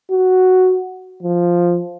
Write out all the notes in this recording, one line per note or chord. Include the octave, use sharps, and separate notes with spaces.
F#4
F3